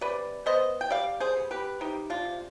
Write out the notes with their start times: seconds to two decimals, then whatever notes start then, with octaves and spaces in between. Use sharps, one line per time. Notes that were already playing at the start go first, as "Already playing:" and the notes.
0.01 C3 B4 D5
0.46 B3 C5 D#5
0.81 G5
0.90 G3 D5 F5
1.20 G#4 C5
1.36 B3
1.51 G4 B4
1.80 C3 D#4 G4
2.10 D4 F4
2.25 C3